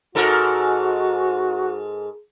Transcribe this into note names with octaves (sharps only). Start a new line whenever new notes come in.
G#2 F#4 A4 A#4